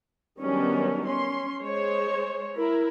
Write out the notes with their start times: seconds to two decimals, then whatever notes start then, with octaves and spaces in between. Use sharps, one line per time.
0.40 D#3 F#3 G3 B3 C#4 D4
1.07 C#4 C6
1.62 G#3 C5 C#5
2.56 E4 A#4